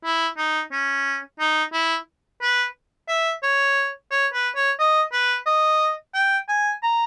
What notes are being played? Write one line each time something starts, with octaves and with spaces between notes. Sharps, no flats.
E4
D#4
C#4
D#4
E4
B4
E5
C#5
C#5
B4
C#5
D#5
B4
D#5
G5
G#5
A#5